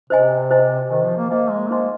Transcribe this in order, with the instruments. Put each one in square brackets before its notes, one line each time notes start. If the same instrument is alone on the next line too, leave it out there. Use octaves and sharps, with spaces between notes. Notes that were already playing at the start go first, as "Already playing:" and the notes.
[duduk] C3 [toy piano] C5 D#5 G#5
[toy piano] C5 D#5 G#5
[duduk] D#3 [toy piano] C5 D#5 G#5
[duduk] F3
A#3
[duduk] A#3 [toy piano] C5 D#5 G#5
[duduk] G#3
[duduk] A#3 [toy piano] D#4 C5 D#5 G#5 C6